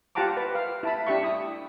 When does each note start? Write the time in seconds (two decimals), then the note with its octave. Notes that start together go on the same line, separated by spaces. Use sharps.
0.15 F4 G4 F#5 A5 A#5 D6
0.37 B4
0.55 F5
0.83 E4 A5 B5
1.07 D4 G4 E5 C#6
1.23 E4 D#6